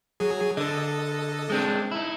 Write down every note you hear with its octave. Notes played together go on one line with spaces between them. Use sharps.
F#3 G#4
D3 A4 D#5
G#3 C4 D4
D#4 E4